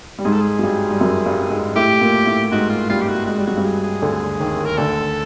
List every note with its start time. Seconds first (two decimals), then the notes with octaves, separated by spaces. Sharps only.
0.19 G3
0.24 G#2 G#3 G#4
0.33 A4
0.41 G#4
0.59 F#3
0.63 G2 G3
0.91 G3
1.01 F#2 F#3
1.25 G2 G3
1.50 G#2 G#3
1.76 A2 A3 G4
2.01 A#2 A#3
2.26 A2 A3
2.51 G#2 G#3 F#4
2.70 F4
2.89 G2 G3 F4
3.02 G4
3.09 F#4
3.26 G#3 F#4
3.37 G3
3.46 F#3 F#4
3.57 G2 G3
3.64 G#4
3.84 G#4
4.02 D2 D3
4.40 D#2 D#3
4.66 A#4
4.78 D2 D3 A4